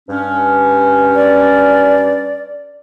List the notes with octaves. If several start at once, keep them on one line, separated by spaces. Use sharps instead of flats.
G2 C#4
D5